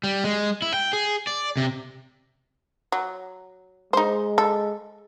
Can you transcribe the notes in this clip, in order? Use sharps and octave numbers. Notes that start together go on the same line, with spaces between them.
G3
G#3
E4
G5
G#4
D5
C3
F#3
G#3 D#4 C5
A4